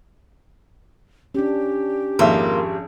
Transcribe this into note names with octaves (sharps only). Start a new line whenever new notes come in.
C#4 D4 G4
G#1 F2 A#3 F4 G#4 E5